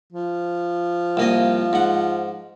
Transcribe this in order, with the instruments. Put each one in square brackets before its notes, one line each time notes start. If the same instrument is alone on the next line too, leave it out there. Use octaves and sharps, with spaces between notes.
[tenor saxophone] F3
[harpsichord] C2 A#3 D#5
G#2 F#5